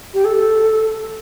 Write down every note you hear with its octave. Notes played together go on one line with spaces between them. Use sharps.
G4
A4